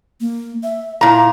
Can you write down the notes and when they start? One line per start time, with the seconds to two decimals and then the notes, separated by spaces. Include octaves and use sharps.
0.21 A#3
0.63 E5
1.01 A#2 E4 A#5